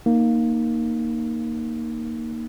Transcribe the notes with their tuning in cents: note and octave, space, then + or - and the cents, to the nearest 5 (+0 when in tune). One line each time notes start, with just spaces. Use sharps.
A#3 +0 D#4 -5